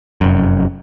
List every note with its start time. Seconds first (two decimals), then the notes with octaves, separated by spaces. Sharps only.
0.21 F1 F#2